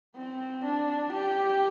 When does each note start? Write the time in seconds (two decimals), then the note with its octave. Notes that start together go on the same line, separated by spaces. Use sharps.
0.16 C4
0.64 D4
1.13 G4